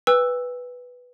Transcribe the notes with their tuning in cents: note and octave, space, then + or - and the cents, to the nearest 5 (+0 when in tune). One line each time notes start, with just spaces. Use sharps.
B4 +0 G5 +45 E6 +0